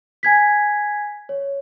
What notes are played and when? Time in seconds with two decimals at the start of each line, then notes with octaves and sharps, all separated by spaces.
0.23 G#5 G#6 B6
1.29 C#5